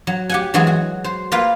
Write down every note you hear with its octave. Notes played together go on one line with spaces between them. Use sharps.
F#3
G4 F#5 G#5
E3 F#3 G#3 F#4 G#4
F#4
C5
A#3 F4 B4 F5